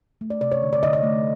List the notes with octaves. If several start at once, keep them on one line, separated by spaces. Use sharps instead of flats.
A3
D5
C3 D5
C#5
D3
D5
D3 D#5
D#5
A3